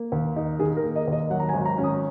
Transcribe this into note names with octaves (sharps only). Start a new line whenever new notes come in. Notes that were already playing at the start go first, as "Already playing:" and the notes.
Already playing: A#3
D#2
D#4
D#3 G#4
A#4
A#3
D#5
D#2 D#5
F#3 F#5
A#5
G#5
G#1
A#5
C#4
D#6